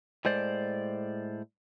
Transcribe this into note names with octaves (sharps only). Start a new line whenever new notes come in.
A2 G#3 C5 D5